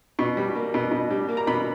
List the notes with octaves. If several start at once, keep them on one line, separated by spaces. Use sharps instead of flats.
B2 C#6
G3
A#3
B2
B2
G3
A#3
A#5
B2 B5